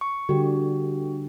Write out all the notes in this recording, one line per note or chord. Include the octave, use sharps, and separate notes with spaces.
C#6
D3 G3 F#4 G4